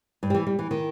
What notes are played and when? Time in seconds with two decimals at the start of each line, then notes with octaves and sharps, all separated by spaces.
0.23 G2
0.30 G3
0.34 E3
0.47 G3
0.59 E3
0.71 D#3